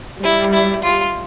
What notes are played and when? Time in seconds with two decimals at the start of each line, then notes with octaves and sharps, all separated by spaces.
0.23 G3 E4
0.53 E4
0.83 F4